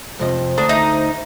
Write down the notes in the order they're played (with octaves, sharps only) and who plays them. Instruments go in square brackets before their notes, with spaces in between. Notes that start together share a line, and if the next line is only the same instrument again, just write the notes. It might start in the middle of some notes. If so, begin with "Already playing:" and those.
[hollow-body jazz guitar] F2 C3 D#5 [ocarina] C5
[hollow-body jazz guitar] D2 [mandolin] D4 [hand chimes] A4 A#5 D#6
[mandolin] D#4 [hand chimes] E5